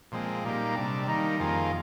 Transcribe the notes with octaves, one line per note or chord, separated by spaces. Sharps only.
A#2 F3 G#3 C4
A#2 G3 A#3 D#4 G4
C3 G3 D4
D#3 G3 A#3 D#4
F2 D#3 A#3 F4 G#4